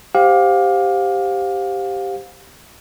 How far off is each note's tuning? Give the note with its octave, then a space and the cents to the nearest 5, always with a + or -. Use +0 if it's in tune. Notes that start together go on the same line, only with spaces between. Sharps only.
G4 +0 C5 +0 F5 +25